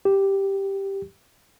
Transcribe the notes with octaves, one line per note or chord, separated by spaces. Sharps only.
G4